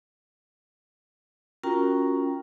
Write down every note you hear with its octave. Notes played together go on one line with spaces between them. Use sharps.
C#4 F4 F#4 A#4 G5 A#5